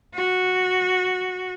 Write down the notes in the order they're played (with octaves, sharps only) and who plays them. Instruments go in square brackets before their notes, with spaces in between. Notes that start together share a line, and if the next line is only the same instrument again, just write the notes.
[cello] F#4